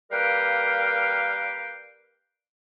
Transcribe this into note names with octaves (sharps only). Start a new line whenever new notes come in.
G3 A#3 A#4 B4 F5 G5